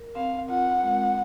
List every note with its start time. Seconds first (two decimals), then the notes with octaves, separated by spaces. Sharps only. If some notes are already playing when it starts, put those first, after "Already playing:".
Already playing: A#4
0.15 C4 F5
0.50 F4 F#5
0.83 G#3